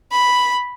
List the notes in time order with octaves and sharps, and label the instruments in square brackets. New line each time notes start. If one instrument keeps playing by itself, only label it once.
[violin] B5